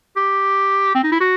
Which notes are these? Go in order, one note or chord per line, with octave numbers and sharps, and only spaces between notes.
G4
C4
D#4
E4
F#4